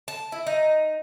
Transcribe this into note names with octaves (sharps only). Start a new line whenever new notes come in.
A5
E4
D#4